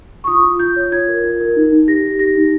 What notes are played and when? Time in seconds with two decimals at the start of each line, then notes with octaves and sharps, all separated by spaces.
0.24 C#6
0.27 F4 D#6
0.44 F4
0.59 F4 G6
0.76 C#5
0.92 F4 G#6
1.08 A#4
1.23 F4
1.40 A#4
1.56 D#4
1.72 D#4
1.87 G4 A#6
2.04 G4
2.19 G4 A#6
2.36 D#4